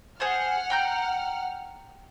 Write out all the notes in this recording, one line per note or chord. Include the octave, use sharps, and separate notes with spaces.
G#4 C5 F#5 A5 F6
G5 A#5 G6